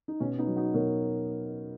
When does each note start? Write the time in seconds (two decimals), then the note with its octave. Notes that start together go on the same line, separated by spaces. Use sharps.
0.08 D#4
0.20 B2 C#4
0.38 B3 D#4
0.47 F#3
0.56 D#4 F#4
0.74 B2 A#4 C#5